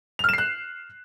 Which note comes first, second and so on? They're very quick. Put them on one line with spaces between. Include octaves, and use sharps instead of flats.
F7 F6 E7 C7 F#6